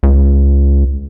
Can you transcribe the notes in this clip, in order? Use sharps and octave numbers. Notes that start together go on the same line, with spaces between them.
C#2